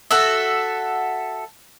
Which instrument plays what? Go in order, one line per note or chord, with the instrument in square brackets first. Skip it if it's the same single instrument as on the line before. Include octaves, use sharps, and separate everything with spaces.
[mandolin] F#4 A4 E5